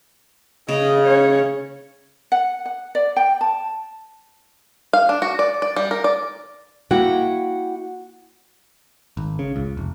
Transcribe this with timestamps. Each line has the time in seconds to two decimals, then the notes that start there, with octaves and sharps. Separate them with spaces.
0.69 C#3 D#5
1.05 C#4 C#5
2.32 F#5
2.66 F#5
2.95 D5
3.16 G5
3.41 A5
4.93 F5
5.09 D4
5.22 F#4
5.39 D5
5.62 D5
5.76 G3
5.91 A#4
6.04 D5
6.91 A#3 E4 F#4 F#5 G5
9.17 G#1
9.39 C#3
9.56 C#2
9.77 F1